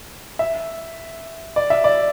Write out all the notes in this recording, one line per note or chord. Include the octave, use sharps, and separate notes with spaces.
E5
D5
E5
D5